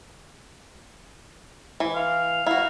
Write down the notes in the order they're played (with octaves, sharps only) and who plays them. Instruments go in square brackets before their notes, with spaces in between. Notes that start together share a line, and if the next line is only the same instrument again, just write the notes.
[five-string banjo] E3
[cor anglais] F5
[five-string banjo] E4 F#4 [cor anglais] F5